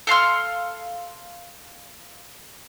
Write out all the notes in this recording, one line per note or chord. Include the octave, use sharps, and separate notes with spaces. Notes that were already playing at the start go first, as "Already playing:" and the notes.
A4 F5 C6 F6